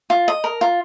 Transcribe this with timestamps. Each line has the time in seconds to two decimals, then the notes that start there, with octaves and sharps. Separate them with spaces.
0.10 F4
0.28 D#5
0.44 A#4
0.61 F4